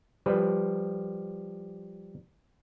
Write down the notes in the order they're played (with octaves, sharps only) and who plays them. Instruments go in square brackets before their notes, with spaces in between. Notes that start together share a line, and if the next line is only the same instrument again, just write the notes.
[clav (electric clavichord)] F3 G3 B4